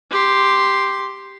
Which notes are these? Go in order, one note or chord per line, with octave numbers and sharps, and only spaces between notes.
G4 C6